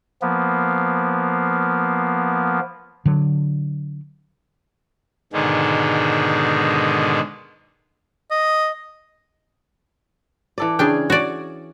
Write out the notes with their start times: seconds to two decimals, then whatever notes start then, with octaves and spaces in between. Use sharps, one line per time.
0.22 F3 A#3 B3
3.06 D3 F#3
5.33 G#2 B2 D3 D#3 G#3
8.31 D#5
10.58 E3 A4 D5
10.79 C#3 C#4 D4 G#4 G5
11.10 F#4 C#5 D5